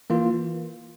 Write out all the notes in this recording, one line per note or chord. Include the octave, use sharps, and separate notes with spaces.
E3 A#3 F4